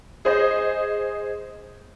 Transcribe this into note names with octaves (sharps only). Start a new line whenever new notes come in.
G#4 C5 D#5